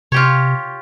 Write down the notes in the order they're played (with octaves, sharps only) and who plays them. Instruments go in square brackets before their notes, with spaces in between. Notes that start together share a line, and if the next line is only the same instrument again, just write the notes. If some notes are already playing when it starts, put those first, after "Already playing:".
[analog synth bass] C3 [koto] F4 G4 C#5